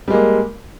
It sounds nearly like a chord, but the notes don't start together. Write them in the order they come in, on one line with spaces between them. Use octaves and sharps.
G3 G#3 A#3